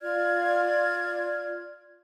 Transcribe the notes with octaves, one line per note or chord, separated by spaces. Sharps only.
F4 D5 F6 G#6